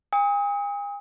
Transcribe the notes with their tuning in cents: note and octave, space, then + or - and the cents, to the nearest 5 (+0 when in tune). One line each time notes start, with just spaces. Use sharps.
G#5 -40 D#6 +35